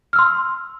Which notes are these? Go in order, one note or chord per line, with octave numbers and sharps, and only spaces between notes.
C6 E6 F6